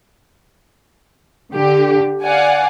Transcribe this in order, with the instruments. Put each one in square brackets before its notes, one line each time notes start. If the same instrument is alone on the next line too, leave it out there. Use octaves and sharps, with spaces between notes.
[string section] D3 G4
D5 F5 F#5 G#5